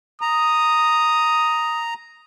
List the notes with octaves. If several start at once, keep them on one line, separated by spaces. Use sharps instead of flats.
A#5 D#6